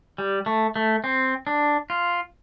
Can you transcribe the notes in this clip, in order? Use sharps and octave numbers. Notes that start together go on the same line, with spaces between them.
G3
A3
A3
C4
D4
F4